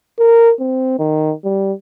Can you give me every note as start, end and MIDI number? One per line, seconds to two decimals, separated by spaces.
0.19 0.53 70
0.60 0.96 60
0.99 1.33 51
1.44 1.73 55